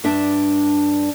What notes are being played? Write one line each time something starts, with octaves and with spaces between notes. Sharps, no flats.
G2 D4 E5